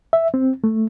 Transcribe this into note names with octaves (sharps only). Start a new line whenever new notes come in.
E5
C4
A3